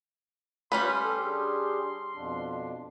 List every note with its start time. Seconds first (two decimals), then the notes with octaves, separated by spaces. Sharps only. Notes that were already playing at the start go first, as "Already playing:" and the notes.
0.72 G3 C#4 B4 C6
1.03 G4 A4
1.24 D4 G4 G#4
2.13 F2 B2 D4